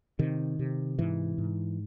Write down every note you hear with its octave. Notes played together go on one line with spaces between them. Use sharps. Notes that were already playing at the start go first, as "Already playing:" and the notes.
C3 D#3
C3
G#2 E3
G#2